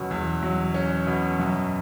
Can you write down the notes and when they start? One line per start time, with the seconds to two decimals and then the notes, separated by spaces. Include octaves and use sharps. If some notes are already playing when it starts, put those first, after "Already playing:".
Already playing: E2 B2 F#3 C#4
0.11 E2
0.43 F#3
0.74 C#4
1.07 B2
1.39 F#2